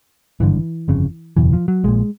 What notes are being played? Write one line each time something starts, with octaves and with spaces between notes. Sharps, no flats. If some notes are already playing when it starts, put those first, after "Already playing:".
G#1 G2 D3 E3
G1 F2 C#3
F#1 E2 B2 E3
F3
F#3
A#1 A#2 G#3